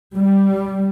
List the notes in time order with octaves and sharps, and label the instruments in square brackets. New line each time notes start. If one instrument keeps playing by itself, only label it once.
[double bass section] G3